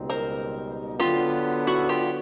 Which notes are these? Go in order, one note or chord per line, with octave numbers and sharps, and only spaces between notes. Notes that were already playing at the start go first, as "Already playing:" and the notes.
Already playing: C#2 B2 G3 C4 D#4
A#4 C5
D3 F#3 B3 F4 G4
E4 F#4
F4 G4